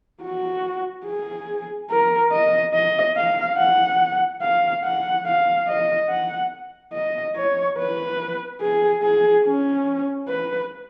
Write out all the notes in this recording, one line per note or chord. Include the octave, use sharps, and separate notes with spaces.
F#4
G#4
A#4
D#5
D#5
F5
F#5
F5
F#5
F5
D#5
F#5
D#5
C#5
B4
G#4
G#4
C#4
B4